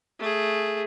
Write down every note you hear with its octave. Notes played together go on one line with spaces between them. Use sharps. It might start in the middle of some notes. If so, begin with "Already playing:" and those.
A3 G#4